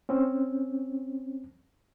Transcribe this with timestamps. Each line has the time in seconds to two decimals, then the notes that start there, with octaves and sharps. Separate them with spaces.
0.09 C4 C#4